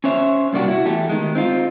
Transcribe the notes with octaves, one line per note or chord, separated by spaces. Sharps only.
C#4 C5 C#5 E5
G2 C3 A#3 D4 F#4 G4
E4 F#4
E2 A3 G4
D#3 G#3
C4 D#4 F4